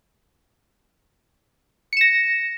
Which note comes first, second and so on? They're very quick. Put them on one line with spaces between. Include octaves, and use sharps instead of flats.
C#7 E7 A#6